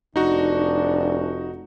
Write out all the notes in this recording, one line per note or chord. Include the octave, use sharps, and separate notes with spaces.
F1 D4 D#4 F#4